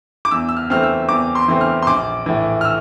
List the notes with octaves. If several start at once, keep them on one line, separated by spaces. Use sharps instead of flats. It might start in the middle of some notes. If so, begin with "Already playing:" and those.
D6
E2 E6
E6
F6
E3 A3 C4 F6
E6
E2 D6
C6
E3 A3 C4
F6
C6
A#1 D6
A2 E3
F6
E6